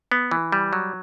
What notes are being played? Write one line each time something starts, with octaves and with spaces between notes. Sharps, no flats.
B3
E3
G3
F#3